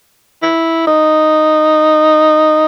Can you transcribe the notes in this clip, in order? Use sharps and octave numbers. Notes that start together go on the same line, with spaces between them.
E4
D#4